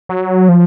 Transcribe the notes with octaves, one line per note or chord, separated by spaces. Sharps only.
F#3
F3